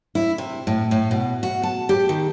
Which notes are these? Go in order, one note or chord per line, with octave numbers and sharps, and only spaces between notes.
E4
C3
A2
A2
B2
F#4
A5
G4
D#3